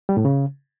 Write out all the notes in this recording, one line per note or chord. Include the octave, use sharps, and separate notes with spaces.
G3
A2
C#3